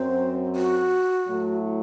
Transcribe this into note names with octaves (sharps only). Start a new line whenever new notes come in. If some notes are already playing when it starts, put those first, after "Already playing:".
Already playing: F#2 F#3 C4 C5
F#4
A2 F#3 A3 E4